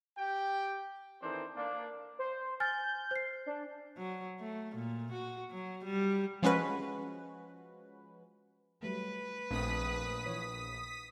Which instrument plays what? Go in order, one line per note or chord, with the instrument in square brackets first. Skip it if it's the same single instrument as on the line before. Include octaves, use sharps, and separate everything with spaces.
[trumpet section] G4 G5
[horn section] D#3 E3 C4 D4 A4 C5
A#3 D4
[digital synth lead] C5
[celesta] G#5 F6 A6 [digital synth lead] G6
[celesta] C5 C7
[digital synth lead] D4
[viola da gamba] F#3
A3
A#2
F#4
F#3
G3
[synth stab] F3 G#3 C#4 F#4 B4
[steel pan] F#3 G3 A3 [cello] B4
[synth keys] A#1 [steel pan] A3 C4 D4 [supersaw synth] D#6 B6
[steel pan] E3 C#5